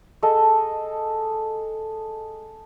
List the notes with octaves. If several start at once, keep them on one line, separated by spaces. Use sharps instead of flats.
G#4 A4 D#5 A5